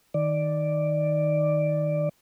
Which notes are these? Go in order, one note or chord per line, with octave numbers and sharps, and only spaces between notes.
D#3 D5